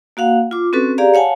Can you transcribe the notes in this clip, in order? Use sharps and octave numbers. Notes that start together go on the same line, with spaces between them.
A#3 F#4 F5 F#5
F4 D6
C4 C#4 F#4 A4 B4
G4 G#4 D5 F5 A#5
C#5 F5 F#5 G#5 A5